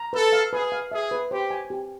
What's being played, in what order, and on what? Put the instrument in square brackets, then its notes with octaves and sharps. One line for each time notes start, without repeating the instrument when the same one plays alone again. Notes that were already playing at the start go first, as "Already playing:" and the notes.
Already playing: [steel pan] A#5
[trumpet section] A4 [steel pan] B4
[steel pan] F5
[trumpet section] G#4 [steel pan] B4
[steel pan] F5
[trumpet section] G#4 [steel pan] E5
[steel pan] B4
[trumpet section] G4 [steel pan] C5
[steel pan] G#5
G4